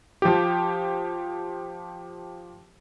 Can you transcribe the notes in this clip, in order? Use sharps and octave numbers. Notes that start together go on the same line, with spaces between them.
F3 G4